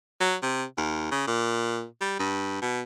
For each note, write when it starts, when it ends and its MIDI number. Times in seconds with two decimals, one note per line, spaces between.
0.20 0.36 54
0.42 0.63 48
0.77 1.11 39
1.11 1.24 49
1.27 1.84 46
2.01 2.19 55
2.19 2.59 43
2.62 2.81 47